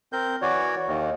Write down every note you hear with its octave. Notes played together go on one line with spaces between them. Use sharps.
C4 A#4 G6
E3 F#4 C#5 D5
D#2 D#3